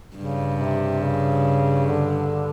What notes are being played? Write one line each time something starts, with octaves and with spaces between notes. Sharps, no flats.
G2 C#3
C3
C#3
D3